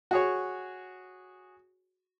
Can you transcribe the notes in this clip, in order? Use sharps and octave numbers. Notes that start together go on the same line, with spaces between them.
F#4 G#4 C#5